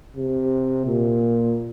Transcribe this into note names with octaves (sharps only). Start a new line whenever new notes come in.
C3
A#2